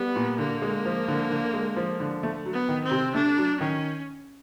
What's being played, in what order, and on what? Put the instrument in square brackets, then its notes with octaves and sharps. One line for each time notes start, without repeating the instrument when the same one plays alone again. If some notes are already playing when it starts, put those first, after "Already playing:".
Already playing: [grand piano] G3 [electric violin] B3
[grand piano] A#2
[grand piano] D3 [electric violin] A#3
[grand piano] G#3
F3
D3
D3
G#3
F3
D3
A3
F#3
[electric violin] B3
[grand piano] D#3
[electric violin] C4
[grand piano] C3
[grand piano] A3 [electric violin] D4
[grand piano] F#3
[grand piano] D#3 [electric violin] C#4